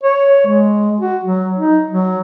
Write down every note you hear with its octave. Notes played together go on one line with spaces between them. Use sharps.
C#5
G#3
F#4
F#3
D#4
F#3